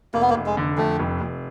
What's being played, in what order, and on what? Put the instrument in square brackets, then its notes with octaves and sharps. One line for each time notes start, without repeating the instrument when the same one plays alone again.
[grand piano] F1 [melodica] A#3
[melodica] B3
A#3
[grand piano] F1
[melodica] G#3
[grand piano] D3
[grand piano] F2 [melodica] A3
[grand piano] F1
F1